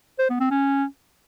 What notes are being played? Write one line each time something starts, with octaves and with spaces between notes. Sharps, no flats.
C5
B3
C4
C#4